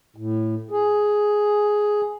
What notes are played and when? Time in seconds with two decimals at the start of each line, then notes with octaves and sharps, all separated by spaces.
0.16 A2
0.71 G#4